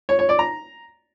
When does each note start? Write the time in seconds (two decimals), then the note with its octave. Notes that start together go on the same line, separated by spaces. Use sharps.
0.09 C#5
0.19 C#5
0.29 D5
0.39 A#5